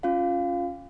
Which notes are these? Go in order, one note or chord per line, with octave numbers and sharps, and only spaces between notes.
C#4 F4 F5